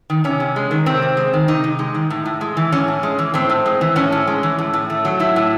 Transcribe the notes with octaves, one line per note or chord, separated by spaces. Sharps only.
D#3
C3 C#4
C3
G#3
D#3
C3 C4
C3
G#3
D#3
C3 D#4
C3
G#3
D#3
A2
A2
G#3
E3
A2 C#4
A2
G#3
E3
A2 C4
A2
G#3
E3
A2 C#4
A2
G#3
E3
A2
A2
A3
F#3
A2 E4
A2